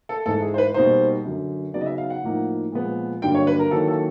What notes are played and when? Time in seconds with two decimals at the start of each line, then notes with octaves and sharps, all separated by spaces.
0.09 A4
0.26 G#2 E3 G#3 A4
0.42 G#4
0.54 C5
0.58 B4
0.74 B2 G3 A#3 D#4 C5
1.24 F#2 D3 F#3
1.74 C#3 F#3 B3 D#4 D5
1.81 D#5
1.86 E5
1.98 F5
2.10 F#5
2.23 A2 F3 A#3 D#4
2.72 A#2 F3 G#3 B3
3.22 G2 D3 F#3 A#3 D4 G5
3.34 C#5
3.47 B4
3.59 A#4
3.71 D#3 F#3 A#3 C#4 E4 A4
3.88 A4